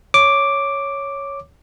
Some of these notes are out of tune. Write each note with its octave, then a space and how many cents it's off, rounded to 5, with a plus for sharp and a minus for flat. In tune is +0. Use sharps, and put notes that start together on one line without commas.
C#5 +0 D6 +0